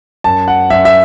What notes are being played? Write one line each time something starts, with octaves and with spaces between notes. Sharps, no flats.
F#2 A5
F#5
F#2 E5
E5